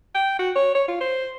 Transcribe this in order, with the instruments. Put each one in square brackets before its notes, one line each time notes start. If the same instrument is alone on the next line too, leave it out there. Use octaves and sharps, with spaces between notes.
[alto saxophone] G5
F#4
C#5
C#5
F4
C5